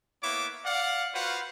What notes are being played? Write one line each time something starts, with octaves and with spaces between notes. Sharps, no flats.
A#3 B3 E4 C#5 E5 D6
D5 F5 F#5
F4 F#4 B4 C5 F5 F#5